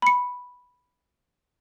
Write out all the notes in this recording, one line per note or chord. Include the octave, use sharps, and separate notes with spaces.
B5 C#7